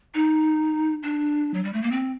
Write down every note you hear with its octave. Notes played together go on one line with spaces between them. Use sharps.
D#4
D4
F#3
G3
A3
A#3
C4